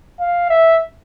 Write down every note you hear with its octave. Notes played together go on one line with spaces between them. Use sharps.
F5
E5